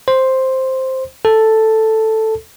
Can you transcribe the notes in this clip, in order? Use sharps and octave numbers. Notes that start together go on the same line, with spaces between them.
C5
A4